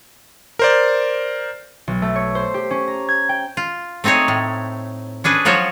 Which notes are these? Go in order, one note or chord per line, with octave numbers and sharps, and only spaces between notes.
A#4 C5 D5
B1
A3
C#5
C5
G4
C#4
A#5
G#6
G5
F4
A3 C4 D#4 G#4 C#5
A2
C#4 D4 G#4 B4
F3 F#3 F4 F#4 C5 C#5